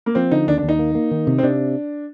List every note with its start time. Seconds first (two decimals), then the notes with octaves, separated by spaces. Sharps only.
0.06 A#3
0.15 F3 C4
0.31 D3 D#4
0.47 D#2 D4
0.58 D4
0.63 D#2
0.69 D#4
0.79 A#3
0.95 A#3
1.11 D#3
1.27 C3
1.38 C4
1.43 C3 D4